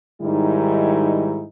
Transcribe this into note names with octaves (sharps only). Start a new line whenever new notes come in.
G#2 D#3 G3 D#4 E4